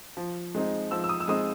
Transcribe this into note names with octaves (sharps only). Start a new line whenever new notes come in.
F3
G#3 C4 D#4
F3 E6
E6
D#6
E6
G#3 C4 D#4 D#6